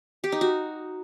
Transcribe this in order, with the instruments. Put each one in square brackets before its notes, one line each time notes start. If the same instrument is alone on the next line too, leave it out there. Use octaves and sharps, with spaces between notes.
[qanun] G4
D#4
F#4